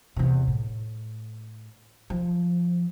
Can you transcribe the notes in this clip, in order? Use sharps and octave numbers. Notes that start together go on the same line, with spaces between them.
E2 C3
A2
F3